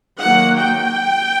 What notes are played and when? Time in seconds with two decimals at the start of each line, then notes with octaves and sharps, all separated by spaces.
0.21 D#3 F#3 A#3 F#5
0.58 G5